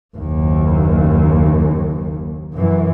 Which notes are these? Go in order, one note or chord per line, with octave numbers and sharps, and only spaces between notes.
F#1 D#2
F#2 E3